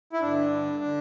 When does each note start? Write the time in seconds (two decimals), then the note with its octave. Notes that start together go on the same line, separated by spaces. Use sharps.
0.13 E4
0.21 G2 D3 D4
0.84 D3